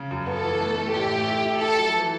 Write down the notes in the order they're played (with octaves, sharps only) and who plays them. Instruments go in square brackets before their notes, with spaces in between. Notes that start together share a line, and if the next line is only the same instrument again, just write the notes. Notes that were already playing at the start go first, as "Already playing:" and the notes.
Already playing: [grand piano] C#3
F#2
[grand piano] B3 [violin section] A4
[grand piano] E3
A3
A3
[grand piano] A1 [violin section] G4
[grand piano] A3
E4
E4
[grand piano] E4 [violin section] A4
[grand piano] F#3
E3